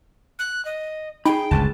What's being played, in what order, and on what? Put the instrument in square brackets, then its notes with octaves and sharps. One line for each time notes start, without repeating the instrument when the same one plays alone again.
[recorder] F#6
D#5
[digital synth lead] D#4 [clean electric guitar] G#4 B5 [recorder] G5
[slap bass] G1 C#2 G2 [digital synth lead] A5